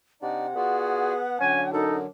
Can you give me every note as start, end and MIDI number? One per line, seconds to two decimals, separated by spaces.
0.22 0.54 48
0.22 0.46 62
0.22 0.46 63
0.22 0.46 74
0.22 1.71 78
0.56 1.40 59
0.56 1.13 65
0.56 1.13 66
0.56 1.22 68
0.56 1.13 74
1.40 2.07 50
1.40 2.07 54
1.40 1.66 61
1.40 2.07 62
1.40 1.66 80
1.73 2.04 42
1.73 1.97 63
1.73 1.98 69